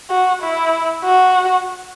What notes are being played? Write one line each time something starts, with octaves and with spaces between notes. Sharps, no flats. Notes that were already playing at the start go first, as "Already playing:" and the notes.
F#4
E4
F#4